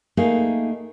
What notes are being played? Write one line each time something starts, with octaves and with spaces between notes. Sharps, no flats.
A3 A#3 D#4 G#4 F5